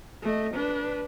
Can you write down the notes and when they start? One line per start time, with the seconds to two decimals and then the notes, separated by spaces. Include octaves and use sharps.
0.23 A3 D#5
0.55 D4 B4